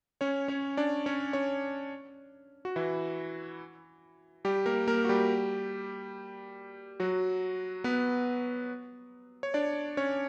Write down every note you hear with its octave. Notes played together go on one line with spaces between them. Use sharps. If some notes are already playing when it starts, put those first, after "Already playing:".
C#4 C#5
C#4 C#5
D4 D5
C#4 C#5
C#4 C#5
F#4
E3 E4
G3 G4
A#3 A#4
A#3 A#4
F#4
G3 G4
F#3 F#4
B3 B4
C#5
D4 D5
C#4 C#5